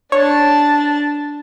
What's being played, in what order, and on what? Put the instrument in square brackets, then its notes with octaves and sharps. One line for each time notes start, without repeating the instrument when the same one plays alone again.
[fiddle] D4 A5 [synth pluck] C#5